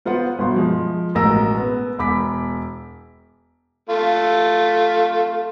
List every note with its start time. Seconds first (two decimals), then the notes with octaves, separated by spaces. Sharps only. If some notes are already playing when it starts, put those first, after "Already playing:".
0.05 B3 F4 B4 C5 F#5
0.39 G1 B2 C6
0.56 F3 G#3
1.15 A1 B2 G#3 A#4 E6 A#6
1.58 B3
1.98 E1 B5 D6 B6
3.90 A3 F4